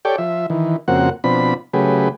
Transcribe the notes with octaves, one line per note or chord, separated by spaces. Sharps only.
G4 A4 C#5 D5 G5
F3 E5
D#3 E3
F2 C#3 A#3 C4 F#4 F#5
B2 F3 C4 D4 B5
C#3 F#3 A3 G4 G#4 B4